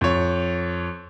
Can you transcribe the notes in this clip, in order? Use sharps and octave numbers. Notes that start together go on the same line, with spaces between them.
F2 C#5